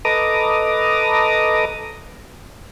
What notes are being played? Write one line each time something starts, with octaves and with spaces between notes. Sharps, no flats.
A4 B4 D#5 A#5 D6 D#6